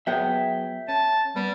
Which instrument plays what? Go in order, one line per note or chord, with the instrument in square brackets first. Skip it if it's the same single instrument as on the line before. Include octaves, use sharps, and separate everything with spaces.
[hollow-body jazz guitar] F#3 B3 G#4 [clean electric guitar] E5 G5
[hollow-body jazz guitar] C#4 [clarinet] A5
[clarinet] G3 [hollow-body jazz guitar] B3